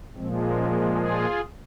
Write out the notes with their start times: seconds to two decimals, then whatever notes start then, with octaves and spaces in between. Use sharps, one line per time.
0.15 A#2 F3 G#3 C4
0.55 A#3 C#4
0.94 F4 G#4